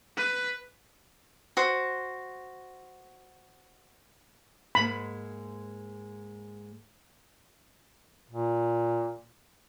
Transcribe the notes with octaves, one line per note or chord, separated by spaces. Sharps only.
B4
F#4 C5
G#2 G#3 A#3 B5
A#2